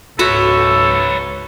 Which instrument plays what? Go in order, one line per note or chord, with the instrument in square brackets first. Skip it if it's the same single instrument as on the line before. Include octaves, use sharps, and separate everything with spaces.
[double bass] C#2 G#2 [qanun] F#4 E5 F#5 [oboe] A4 [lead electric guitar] B4 C#5